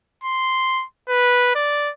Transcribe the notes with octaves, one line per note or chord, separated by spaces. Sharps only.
C6
B4
D5